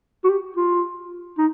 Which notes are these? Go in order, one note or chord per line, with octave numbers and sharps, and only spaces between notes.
F#4
G4
F4
D#4